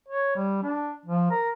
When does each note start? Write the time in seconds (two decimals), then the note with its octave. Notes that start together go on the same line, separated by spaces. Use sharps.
0.09 C#5
0.36 G3
0.63 D4
1.06 F3
1.31 A#4